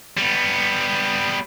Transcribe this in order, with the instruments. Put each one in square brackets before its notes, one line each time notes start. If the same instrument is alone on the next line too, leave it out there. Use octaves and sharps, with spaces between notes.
[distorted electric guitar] G3 B3